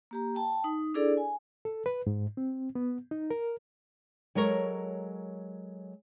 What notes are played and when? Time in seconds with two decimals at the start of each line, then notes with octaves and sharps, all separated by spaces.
0.11 A#3 G4 A#5
0.35 G5 A5
0.64 D#4
0.94 D4 E4 G#4 A4 D5
1.17 G#5
1.65 A4
1.86 B4
2.07 G#2
2.37 C4
2.75 B3
3.11 D#4
3.31 A#4
4.35 F#3 G#3 A4 A#4 C#5